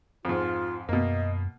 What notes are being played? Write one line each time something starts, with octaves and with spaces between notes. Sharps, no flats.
F2 G#2 F4
F#2 B2 A#3 D#5